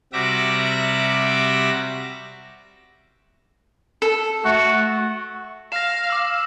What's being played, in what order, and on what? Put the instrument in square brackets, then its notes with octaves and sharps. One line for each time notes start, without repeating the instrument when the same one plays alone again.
[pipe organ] C3 G3 F#4 E5 D6 A#6
[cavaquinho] A4
[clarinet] A3 [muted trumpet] F#4
[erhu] F5 [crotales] A#6 E7
[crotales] D6 E6